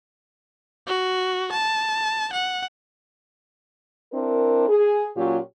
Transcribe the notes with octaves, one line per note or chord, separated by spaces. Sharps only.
F#4
A5
F#5
C4 D4 E4 A#4
G#4
A#2 F#3 C#4 F4 G4